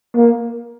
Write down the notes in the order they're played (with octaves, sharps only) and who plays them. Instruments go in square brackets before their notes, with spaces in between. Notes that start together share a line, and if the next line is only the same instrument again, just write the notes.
[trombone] A#3